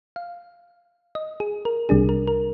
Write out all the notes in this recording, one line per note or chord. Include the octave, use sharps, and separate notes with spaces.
F5
D#5
G#4
A#4
C2 C3 G3 D4 G#4
A#4
A#4